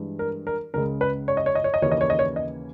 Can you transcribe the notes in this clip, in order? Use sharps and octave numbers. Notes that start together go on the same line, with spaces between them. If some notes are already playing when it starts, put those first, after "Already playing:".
Already playing: G2 E3 G#3
A#4
A#4
C#2 C#3 G#3 A#4
B4
C#5
D#5
C#5
D#5
C#5
D#5
D#2 C#3 E3 A#3 C#4 C#5
D#5
C#5
D#5
C#5
D#5